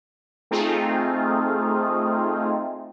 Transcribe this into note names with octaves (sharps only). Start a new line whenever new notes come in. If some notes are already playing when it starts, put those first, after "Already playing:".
A3 C4 D#4 F4 G#4